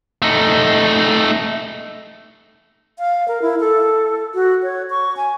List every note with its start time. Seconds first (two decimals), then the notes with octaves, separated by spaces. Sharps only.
0.22 A3 D#4
2.99 F5
3.28 A#4
3.42 E4
3.60 A4
4.35 F#4
4.63 C#5
4.90 C#6
5.17 G#5